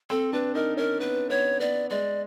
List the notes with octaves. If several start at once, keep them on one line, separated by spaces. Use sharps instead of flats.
C4 A4
D4 B4
D#4 A#4
C#4 A#4
B3 B4
B3 C#5
B3 D5
G#3 D5